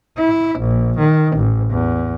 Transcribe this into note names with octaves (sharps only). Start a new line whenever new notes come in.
E4
A#1
D#3
A1
E2